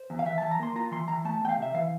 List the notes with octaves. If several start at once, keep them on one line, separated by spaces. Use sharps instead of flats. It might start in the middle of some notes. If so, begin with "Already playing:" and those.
Already playing: C5
E2
F5
E3 E5
E3 A5
A#5
A#3 C6
F4 A#5
E3 C6
E3 A#5
A3 A5
E2 G5
F5
C3 E5
E3 F5